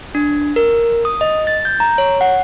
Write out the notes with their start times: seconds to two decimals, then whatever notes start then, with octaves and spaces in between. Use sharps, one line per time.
0.15 D4
0.56 A#4
1.05 D#6
1.21 D#5
1.47 A6
1.65 G6
1.80 A#5
1.98 C#5
2.21 F#5